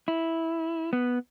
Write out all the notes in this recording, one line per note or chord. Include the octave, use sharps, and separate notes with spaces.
E4
B3